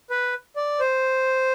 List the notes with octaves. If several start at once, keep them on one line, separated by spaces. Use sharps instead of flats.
B4
D5
C5